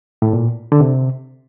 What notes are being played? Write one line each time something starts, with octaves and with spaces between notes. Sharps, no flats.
A2
A#2
D3
C3